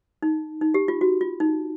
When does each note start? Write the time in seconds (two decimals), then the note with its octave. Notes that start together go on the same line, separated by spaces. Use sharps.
0.22 D#4
0.61 D#4
0.74 G4
0.88 F4
1.01 F#4
1.21 F4
1.40 D#4